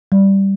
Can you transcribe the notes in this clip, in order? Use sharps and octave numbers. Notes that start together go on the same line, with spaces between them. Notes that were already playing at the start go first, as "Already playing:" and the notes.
G3